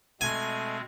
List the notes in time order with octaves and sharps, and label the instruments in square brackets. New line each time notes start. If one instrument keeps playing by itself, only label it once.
[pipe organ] B2 G#3 C4 [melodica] A3 [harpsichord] G#5